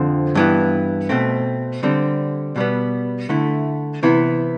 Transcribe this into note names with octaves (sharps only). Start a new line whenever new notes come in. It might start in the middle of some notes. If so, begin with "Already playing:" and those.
Already playing: F2 D3 F3 C4
G2 E3 B3
B2 A3 C4
D3 G3 C4
B2 G3 B3
D3 A3 E4
C3 E3 B3 E4